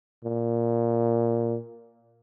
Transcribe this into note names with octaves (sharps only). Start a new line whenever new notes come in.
A#2